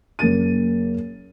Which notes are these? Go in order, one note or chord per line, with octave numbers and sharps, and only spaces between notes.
F#1 A#3 A6 D#7